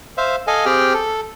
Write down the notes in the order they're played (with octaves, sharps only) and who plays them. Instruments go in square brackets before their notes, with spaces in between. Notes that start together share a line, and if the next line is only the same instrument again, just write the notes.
[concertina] C5 E5 F5
A4 D#5 F5 G#5
C4 G4 G#4 G5 F6
A4